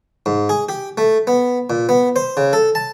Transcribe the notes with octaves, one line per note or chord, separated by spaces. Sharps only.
G#2
G#4
G4
A3
B3
A#2
B3
C5
C#3
A4
A5